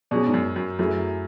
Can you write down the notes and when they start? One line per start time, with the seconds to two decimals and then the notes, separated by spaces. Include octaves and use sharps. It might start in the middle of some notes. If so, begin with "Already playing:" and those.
0.11 B2 F#3 C#4 G#4 D5
0.26 G#2
0.34 F#2
0.56 F#2
0.79 F#2 F#3 A3 E4 G#4